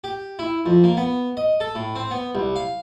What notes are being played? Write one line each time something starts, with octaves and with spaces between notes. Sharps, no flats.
G4
E4
F2
A#3
B3
D#5
A4
A2
C4
B3
C2
F5